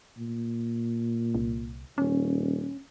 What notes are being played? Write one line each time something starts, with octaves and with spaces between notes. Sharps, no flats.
A#2
C2
D#1 C#4